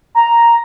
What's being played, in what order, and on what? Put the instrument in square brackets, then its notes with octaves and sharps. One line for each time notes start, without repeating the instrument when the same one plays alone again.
[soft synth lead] A#5